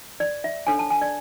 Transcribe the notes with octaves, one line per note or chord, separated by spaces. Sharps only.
D5
E5
D4 A4 C#5 G#5
A5
G#5
D5